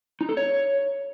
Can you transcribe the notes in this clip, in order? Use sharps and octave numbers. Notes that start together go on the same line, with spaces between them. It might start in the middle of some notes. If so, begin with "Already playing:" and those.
D#4
A4
C#5